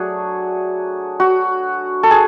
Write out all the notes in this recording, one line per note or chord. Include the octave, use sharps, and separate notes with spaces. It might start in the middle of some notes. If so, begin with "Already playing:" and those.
Already playing: F#3 A3 D4 F#4 G#4
F#4
A4
G#4